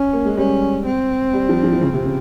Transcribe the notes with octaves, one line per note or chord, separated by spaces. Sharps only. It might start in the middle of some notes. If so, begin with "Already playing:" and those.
Already playing: C#4
A#3
G#3
G3 C#4
C4
G3
F3
F3
E3
C#3
C3
C#3